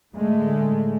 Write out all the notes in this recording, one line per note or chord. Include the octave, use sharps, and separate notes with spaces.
A2 D3 G#3 A3